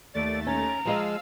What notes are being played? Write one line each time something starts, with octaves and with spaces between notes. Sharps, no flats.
D#2 A3 D5 A6
C#4 A#5
F3 G#3 D#5 F5 E6